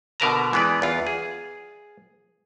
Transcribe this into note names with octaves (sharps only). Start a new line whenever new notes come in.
B2 D3 A#4 B4 A5 A#5
E3 G#3 B3 B4 D5
E2 F4
G#4